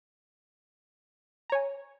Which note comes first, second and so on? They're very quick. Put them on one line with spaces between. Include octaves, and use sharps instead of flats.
A#5 C#5 G#5